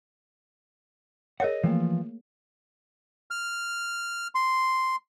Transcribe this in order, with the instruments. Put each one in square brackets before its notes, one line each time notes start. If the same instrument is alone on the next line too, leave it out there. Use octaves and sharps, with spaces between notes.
[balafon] G#4 A#4 C#5 [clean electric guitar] D#5 F#5
[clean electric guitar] E3 F3 [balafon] A3 A#3
[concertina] F6
C6